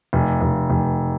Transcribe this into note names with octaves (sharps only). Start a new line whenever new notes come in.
F1
F1
F1